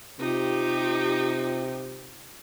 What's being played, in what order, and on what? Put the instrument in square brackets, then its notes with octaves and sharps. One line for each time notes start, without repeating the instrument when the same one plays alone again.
[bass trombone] C3 [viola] D#4 G4 [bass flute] F4